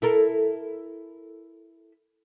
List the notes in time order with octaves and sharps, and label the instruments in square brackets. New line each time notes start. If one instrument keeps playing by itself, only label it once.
[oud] E4 A4 A#4